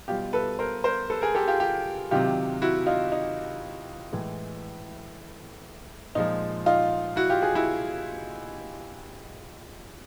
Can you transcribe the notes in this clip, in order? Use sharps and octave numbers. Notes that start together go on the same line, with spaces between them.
B2 G3 F4 G4
A4 B4
A#4 C5
A#4 C5
A4 B4
G#4 A#4
G4 A4
F4 G4
F4 G4
C3 D#3 F#3 F4 G4
E4 F#4
D#4 F4
D#4
A2 E3 G#3
A#2 F3 G#3 D#4
D#4 F4
E4 F#4
F4 G4
F#4 G#4
E4 F#4